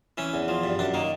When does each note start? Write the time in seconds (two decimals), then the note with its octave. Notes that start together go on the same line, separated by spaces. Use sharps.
0.18 E3 C#4
0.34 E2
0.48 F3
0.64 G2
0.79 F#2 D4
0.94 D#3 A#3